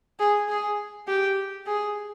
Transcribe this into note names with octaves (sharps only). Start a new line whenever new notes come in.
G#4
G#4
G4
G#4